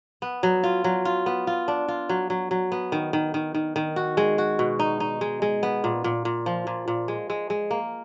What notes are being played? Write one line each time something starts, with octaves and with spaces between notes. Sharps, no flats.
B3
F#3
F4
F#3
F4
B3
F4
D4
F4
F#3
F#3
F#3
B3
D#3
D#3
D#3
D#3
D#3
F#4
G#3
F#4
B2
D#4
D#4
G#3
G#3
B3
A#2
A#2
A#2
F3
A#2
A#2
G#3
G#3
G#3
A#3